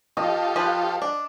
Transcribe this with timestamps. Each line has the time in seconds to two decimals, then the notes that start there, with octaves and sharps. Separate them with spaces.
0.17 F4 G4 A4 D#5
0.56 F3 B4
1.02 D4